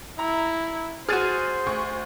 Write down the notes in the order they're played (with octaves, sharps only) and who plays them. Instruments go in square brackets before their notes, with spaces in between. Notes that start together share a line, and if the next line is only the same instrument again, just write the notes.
[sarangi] E4 [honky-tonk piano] A#5
[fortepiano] F#4 G#4 [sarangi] C5 [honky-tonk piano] F6 A6 D#7
[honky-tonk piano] D2 C#6